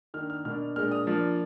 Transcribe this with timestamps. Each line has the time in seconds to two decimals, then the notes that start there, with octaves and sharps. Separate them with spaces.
0.14 D#3 A#3 D4 F6
0.30 F6
0.45 B2 A#3 D4 F6
0.76 A#2 G#3 D4 F6
0.92 D#6
1.07 F3 A#3 D4